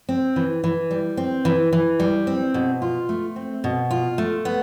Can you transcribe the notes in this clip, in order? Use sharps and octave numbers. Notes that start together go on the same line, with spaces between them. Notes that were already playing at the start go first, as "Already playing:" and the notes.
C4
E3
E3
G3
C4
E3
E3
G3
C4
B2
F4
A3
C4
B2
F4
A3
B3